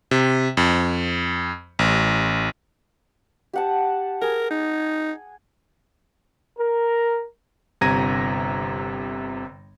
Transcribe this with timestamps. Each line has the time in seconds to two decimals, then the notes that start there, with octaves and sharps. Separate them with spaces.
0.11 C3
0.57 F2
1.79 A1
3.53 G4 F#5 A5
4.21 G#4 A#4
4.51 D#4
6.59 A#4
7.81 G1 C3 A#5 G#6 A#6 D#7